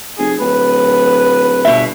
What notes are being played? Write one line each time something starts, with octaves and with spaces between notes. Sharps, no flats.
F1 G#4
D1 B4
G1 B2 E5